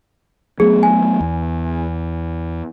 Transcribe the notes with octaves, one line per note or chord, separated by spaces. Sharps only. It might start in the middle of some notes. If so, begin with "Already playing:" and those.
F#3 A3 B3 G#4
G#5
E2